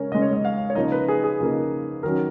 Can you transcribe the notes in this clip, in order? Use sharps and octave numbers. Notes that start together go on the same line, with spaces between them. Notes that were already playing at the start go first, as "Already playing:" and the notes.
Already playing: C#3 G#3 C#4 A#4 C#5
C#3 G#3 C#4 D#5
C#5
D#5
F5
C#5
C#3 F3 A#3 D#4 D#5
B4
G#4
G#4
C#3 F3 A#3 D#4
D#3 F#3 C#4 A#4